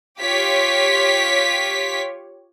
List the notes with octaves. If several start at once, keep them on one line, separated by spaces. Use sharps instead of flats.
F4 G4 C#5 B6